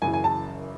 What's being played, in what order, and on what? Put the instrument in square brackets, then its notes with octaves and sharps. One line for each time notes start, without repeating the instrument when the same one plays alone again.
[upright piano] F#1 F#2 C#3 E3 G#5
G#5
A5